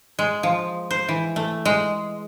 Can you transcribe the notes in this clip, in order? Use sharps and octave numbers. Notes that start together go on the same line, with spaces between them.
G#3
F3
C5
E3
A3
G#3